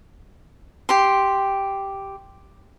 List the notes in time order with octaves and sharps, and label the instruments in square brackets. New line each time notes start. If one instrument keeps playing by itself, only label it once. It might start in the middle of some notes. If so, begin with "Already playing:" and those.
[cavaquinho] G4 C6